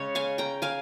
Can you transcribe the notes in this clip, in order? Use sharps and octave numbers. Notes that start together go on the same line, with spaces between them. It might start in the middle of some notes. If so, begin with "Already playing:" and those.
Already playing: C#3 G#3 C#5
F5 G#5
G5 A#5
F5 G#5